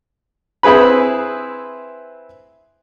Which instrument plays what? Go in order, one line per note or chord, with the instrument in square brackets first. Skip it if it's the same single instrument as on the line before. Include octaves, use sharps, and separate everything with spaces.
[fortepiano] C4 E4 G#4 B4 B5